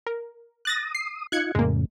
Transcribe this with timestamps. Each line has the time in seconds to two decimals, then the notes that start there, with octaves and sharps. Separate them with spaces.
0.07 A#4
0.65 D#6 F#6 A6 A#6
0.95 C7
1.32 D#4 F4 F#6 G#6 C#7
1.55 F2 A2 C#3 G#3 A#3